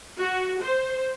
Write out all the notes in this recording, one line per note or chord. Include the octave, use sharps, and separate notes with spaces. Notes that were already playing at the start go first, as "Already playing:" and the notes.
F#4
C5